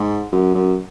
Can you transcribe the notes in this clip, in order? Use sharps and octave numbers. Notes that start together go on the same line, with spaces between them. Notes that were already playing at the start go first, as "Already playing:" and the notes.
Already playing: G#2
F#2
F#2